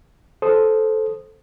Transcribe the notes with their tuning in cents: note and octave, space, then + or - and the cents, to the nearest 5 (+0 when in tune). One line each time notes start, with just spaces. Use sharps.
A4 -10 C5 +0 D#6 -5